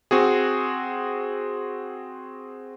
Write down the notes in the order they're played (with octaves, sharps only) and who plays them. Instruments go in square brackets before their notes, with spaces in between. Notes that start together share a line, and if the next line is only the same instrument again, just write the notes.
[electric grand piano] C4 F#4 G#4